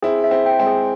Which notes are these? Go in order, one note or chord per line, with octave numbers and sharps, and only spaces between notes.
C4 E4 G#4
E5
C4 E4
G5
G#3 C4
G#4